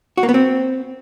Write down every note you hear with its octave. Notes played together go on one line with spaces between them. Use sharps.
F#4
A#3
B3
C4